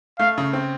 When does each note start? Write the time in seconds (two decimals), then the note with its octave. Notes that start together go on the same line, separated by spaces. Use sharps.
0.19 A3 F5
0.38 C#3
0.53 C4